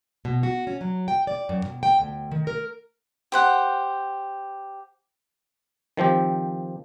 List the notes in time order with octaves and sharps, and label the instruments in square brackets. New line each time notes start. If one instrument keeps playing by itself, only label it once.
[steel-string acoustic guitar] B2
F#4
C#4
F#3
G5
D5
F#2
B2
G5
D2
D#3
A#4
[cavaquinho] G4 C5 F#5
[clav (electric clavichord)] D#3 F3 C4 G4